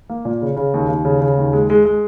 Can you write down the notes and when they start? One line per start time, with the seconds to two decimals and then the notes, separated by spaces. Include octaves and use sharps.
0.09 A#3
0.25 A#2
0.42 C#3
0.56 C#3
0.74 D#2
0.89 D#2
1.05 C#3
1.21 C#3
1.37 D#2
1.53 G#3
1.70 G#3
1.85 G#3